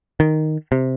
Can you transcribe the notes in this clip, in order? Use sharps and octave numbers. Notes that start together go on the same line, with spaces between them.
D#3
C3